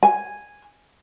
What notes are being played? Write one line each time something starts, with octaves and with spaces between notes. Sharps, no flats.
G#5